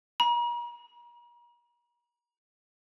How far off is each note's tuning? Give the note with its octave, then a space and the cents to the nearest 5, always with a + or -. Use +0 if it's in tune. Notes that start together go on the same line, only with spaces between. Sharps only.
A#5 +40